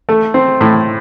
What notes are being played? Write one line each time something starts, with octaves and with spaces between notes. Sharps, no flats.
A3
C4
A2